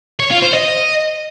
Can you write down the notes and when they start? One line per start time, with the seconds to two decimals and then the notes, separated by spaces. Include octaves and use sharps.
0.20 C#5
0.31 F4
0.42 C5
0.54 D#5